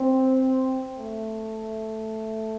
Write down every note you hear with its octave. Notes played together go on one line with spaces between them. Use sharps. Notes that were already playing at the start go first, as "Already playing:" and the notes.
Already playing: C4
A3